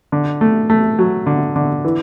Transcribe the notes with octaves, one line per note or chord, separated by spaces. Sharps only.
D3
A3
A3
F#3
D3
D3
E3